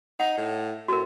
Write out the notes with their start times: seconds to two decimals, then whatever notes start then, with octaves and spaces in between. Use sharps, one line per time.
0.20 D#4 F#5
0.38 A2
0.88 A2 F#4 A#4